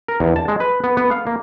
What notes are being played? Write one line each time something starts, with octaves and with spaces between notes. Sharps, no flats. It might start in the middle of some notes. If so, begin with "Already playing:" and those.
A#4
E2
A5
G#3
B4
B3
B3
F5
A#3